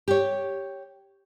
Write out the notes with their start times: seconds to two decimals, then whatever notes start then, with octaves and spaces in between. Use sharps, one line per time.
0.08 G4 C#5